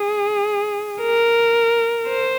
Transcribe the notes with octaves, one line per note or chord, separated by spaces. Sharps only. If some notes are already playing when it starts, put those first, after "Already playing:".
Already playing: G#4
A#4
C5